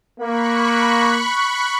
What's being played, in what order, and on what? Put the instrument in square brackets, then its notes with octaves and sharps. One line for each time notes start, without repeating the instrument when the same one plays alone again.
[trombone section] A#3 [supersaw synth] B5 C#6 F#6